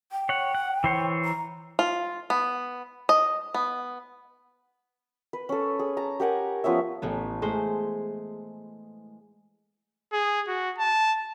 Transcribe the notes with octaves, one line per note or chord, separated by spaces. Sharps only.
G5
C#5 F#5
F#5
E3 C5 C#5
A#5
F4
B3
D#5
B3
B4
C#4 A4
G#4
A5 A#5
G4 A#4 F#5 G#5
F3 B3 C#4 E5
A1 A3 B3
G#3 A3 C5
G#4
F#4
A5